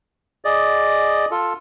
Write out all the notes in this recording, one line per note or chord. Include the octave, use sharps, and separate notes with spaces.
G#4 D5 D#5
F4 A4